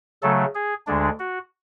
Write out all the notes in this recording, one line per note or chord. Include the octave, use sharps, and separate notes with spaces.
C#3 F#3 A3 A4
G#4
D2 D3 G#3 D4
F#4